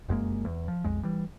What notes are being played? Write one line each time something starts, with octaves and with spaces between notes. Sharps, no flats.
F1 F#2 G#3 A#3
E2
F3
B1 F2 G#3
E3 G3